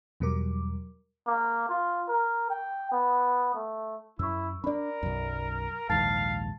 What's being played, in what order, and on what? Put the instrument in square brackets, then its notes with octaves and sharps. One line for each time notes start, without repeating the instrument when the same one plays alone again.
[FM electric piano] E2 B2 F#3 G3 A#4 D6
[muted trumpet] A#3
F4
A#4
G5
B3
A3
[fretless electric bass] F#2 [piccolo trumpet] E4 [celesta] C#6 E6
[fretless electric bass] C#4 D4 [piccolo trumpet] A#4 [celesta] D5 B5
[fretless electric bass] B1 F#2
[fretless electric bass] A#1 D#2 G#2 [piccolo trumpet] F5 [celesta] A5 A6